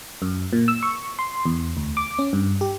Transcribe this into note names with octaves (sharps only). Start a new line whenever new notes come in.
F#2
A#2
E6
C#6
C6
E2
D2
D6
C#4
G2
G4